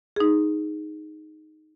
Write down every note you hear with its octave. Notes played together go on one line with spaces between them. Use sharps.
D#4 G#4